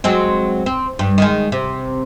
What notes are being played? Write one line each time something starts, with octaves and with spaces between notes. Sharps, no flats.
F#3 G#3 C4
C4
G2
D#3 G#3
C3